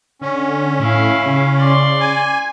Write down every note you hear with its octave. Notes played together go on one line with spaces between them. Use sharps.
D3 C#4
A2 E4 F5
C#3
D5 C6
G#5